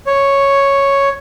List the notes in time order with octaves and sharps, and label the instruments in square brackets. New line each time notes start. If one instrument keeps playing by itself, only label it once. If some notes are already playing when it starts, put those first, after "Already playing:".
[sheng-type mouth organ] C#5